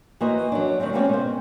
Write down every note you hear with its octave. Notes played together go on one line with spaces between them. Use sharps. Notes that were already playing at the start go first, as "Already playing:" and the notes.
E3 A#3 F#4 B4 C5 D#5
F#3 D4
E2 D#3 G3 A3 C4
G3 G#3 A#3 C4 C#4 D5
B2 C5